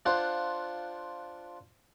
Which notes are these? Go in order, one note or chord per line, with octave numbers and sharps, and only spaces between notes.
D4 F4 C5 F#5